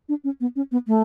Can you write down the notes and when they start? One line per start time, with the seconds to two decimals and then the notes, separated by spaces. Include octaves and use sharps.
0.09 D4
0.24 C#4
0.41 B3
0.56 C#4
0.72 B3
0.87 A3